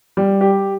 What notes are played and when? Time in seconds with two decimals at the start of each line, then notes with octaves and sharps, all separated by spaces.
0.17 G3
0.41 G4